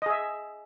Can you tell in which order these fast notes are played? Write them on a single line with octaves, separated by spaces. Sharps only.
D#5 G#4 E5